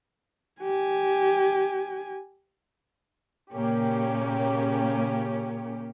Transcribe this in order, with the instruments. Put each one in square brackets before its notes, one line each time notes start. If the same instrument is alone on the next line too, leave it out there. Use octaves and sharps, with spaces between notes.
[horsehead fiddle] G4 G#5
[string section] A#2 C#3 A#3 C#4 G4